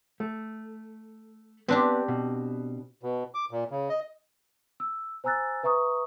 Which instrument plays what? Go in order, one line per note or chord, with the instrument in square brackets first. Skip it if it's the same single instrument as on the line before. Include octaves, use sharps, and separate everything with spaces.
[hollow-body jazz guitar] A3
[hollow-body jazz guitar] B3 [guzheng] C4 D4 G4
[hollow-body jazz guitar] B2
[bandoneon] B2
D6
A#2
C#3
D#5
[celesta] E6
C5 G#5 A#5 E6 F#6 A6
B4 E5 A#5 C#6 D#6